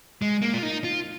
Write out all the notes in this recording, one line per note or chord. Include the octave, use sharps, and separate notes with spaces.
G#3
A#3
F4
D#4
F4